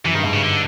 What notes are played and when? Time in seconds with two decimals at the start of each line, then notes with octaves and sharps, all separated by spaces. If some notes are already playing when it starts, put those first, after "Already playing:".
0.05 F#2 E3
0.14 G2 D#3
0.23 G#2 B2
0.33 C#3
0.42 D3